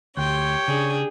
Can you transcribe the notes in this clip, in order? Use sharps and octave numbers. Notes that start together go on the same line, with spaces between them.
D2 G4 C#5 G5 C6
C#3 D4 G#4